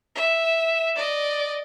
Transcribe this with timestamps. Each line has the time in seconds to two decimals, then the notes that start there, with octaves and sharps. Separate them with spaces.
0.15 E5
0.96 D5 D#5